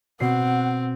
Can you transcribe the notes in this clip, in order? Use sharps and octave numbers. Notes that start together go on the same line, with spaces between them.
B2 C4 F#5 C7